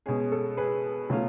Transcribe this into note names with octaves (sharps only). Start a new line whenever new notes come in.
B2 G#3 C#4 G#4
A4
G#4 B4
B2 F#3 A3 C#4 F4